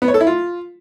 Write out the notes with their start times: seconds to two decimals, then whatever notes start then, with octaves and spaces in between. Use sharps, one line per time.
0.02 B3
0.08 C#5
0.14 A4
0.20 E4
0.27 F4